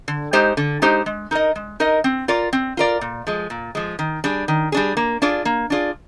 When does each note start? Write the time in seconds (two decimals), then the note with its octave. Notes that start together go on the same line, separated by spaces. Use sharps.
0.08 D3
0.33 G#3 D#4 G4 C5
0.57 D3
0.82 G#3 D#4 G4 C5
1.06 G#3
1.31 D#4 A#4 D#5
1.56 G#3
1.80 D#4 A#4 D#5
2.04 C4
2.28 F4 A#4 D5
2.53 C4
2.77 F4 A#4 D5
3.01 A#2
3.27 F3 G#3
3.50 A#2
3.75 F3 G#3
3.99 D#3
4.24 G3 D4 G#4
4.48 D#3
4.72 G3 D4 G#4
4.97 A#3
5.22 D4 F4 G#4 D5
5.45 A#3
5.70 D4 F4 G#4 D5